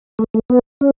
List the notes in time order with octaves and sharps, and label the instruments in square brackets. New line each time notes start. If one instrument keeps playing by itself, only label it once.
[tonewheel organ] A3
A3
B3
C#4